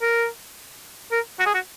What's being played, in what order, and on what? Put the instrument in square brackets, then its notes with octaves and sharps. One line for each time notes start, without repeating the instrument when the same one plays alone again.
[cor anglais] A#4
A#4
F#4
G#4
F#4